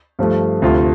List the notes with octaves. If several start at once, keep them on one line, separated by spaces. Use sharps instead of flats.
G2 F3 A3
D2 C3 A3 F4